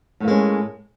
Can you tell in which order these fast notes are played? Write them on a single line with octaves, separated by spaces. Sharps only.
A2 A#3 G#3 C#4